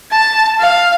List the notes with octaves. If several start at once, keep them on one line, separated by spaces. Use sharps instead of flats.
A5
F5